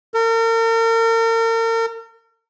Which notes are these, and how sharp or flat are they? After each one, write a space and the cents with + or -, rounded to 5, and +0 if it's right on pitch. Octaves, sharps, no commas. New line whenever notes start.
A#4 -40